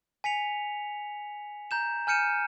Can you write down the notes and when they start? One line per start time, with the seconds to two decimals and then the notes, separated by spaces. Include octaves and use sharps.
0.24 G#5 B6 C#7 F7
1.71 A#5 G6 E7
2.07 G#5 F6 G6 C#7 D#7 E7